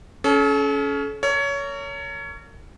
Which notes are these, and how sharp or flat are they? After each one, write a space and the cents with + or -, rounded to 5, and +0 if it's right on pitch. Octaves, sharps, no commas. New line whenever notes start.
C#4 +15 A4 -40
A#4 -35 C#5 +20